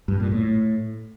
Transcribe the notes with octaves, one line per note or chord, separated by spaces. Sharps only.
G2
A#2
A2